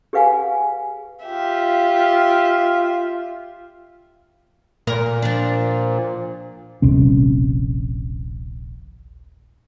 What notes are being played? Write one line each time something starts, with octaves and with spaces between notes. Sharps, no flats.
G4 G#4 B4 F5 F#5 G#5
F4 G4 E5
A#2 A#4
F3 D4
D#1 A#1 C3 C#4